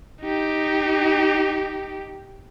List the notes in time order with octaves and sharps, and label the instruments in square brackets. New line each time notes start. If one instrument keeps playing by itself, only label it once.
[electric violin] D#4 G4